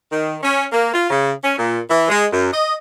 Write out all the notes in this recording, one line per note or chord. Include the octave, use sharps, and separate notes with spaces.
D#3
C#4
A#3
F4
C#3
C#4
A#2
E3
G#3
F#2
D#5